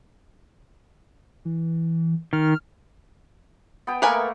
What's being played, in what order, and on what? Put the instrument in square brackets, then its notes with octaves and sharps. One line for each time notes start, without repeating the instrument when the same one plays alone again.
[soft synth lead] E3
[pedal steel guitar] D#3 [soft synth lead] F6
[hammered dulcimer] B3 G5
[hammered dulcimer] A3 A#3 [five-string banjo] A#4 B4 G#5